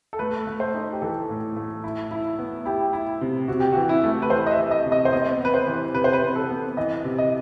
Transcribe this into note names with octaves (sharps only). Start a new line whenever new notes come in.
A4
A3 B4
A3
C5
D#4
G4
E3 A4
A2
A3
E4
E4
B3
E4 G4
E4
C3
C3 F#4
G4
F#4
E3
E4
A3
B4
E3 C5
D#5
E5
E3
D#5
C3
D#5
C5
B3 D#5
B3 B4
C5
E3
C3 B4
C5
B4
C3
A4
B3
E3 D#5
C3
D#5